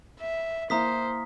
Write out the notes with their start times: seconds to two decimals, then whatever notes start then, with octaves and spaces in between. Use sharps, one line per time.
0.21 E5
0.70 A#3 E4 C5 A#5 D#6 B6